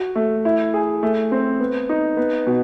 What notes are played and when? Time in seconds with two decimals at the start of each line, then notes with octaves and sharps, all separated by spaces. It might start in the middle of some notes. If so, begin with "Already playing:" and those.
Already playing: F#4
0.16 A3
0.45 E4
0.74 G#4
1.03 A3
1.32 C4
1.60 B3
1.89 D#4
2.17 B3
2.47 B2